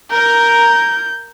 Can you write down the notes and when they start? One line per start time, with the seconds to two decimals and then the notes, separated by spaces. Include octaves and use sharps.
0.12 A#4 G6